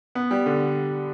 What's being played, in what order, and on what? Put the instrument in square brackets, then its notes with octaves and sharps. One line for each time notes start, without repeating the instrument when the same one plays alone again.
[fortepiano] B3
G3
D3